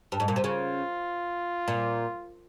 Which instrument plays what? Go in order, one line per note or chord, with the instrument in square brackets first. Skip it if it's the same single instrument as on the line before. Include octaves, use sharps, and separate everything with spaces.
[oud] G2
G#2
A#2
C3
[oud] C#3 [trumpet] F4
[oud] A#2